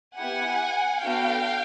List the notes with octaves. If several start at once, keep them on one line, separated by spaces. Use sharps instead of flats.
B3 E4 G4 F#5 G#5
B3 D4 F#4 A4 F5 G5